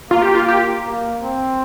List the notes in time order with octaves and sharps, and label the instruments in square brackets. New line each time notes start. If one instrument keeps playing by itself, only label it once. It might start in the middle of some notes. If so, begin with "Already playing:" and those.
[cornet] A#3 [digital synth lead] F4
[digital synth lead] G4
F4
G4
[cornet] A#3
C4